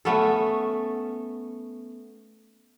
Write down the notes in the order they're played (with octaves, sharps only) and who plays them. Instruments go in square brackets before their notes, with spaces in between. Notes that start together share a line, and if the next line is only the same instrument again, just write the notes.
[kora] A3 B3 C#4 A4